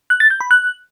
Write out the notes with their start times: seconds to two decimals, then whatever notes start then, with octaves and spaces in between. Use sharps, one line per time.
0.10 F#6
0.20 A6
0.30 G6
0.41 B5
0.51 F#6